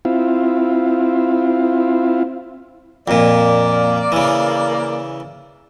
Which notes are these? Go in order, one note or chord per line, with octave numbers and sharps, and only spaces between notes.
C4 E4 F4
F2 A#2 A#3 D5
C#3 E3